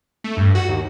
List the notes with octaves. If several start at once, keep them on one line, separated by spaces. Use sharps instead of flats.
A3
G2
F#4
D#2